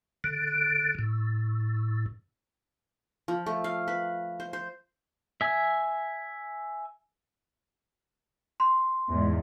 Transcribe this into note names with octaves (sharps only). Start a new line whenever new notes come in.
D3
A2
F3
A3
F5
B4
C5
C5
E5 G#5
C6
E2 G#2